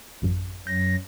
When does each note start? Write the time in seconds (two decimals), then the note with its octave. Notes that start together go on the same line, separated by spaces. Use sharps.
0.22 A1 F#2
0.67 F#2 F#3 G6 A#6